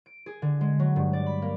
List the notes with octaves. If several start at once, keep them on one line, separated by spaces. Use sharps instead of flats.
D7
G#4
D3
G#3
F#3
G2
D5
B5
A#3